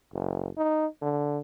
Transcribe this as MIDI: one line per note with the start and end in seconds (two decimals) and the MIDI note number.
0.13 0.48 30
0.57 0.86 63
1.02 1.39 50